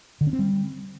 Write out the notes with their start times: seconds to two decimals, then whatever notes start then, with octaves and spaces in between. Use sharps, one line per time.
0.21 D3
0.27 C#4
0.33 C4
0.39 G3